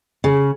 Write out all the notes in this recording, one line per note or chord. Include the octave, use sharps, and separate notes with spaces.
C#3